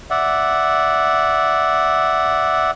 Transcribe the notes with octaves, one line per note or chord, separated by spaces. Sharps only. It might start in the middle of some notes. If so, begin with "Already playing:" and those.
D5 E5 F#5